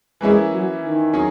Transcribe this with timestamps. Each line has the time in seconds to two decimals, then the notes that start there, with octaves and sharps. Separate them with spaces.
0.20 E3 G#3 A#3 C#4 E4
0.51 F#3
0.82 D#3
1.13 F#3 C#4 G#4